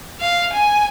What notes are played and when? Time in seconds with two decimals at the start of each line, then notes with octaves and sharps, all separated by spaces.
0.21 F5
0.54 G#5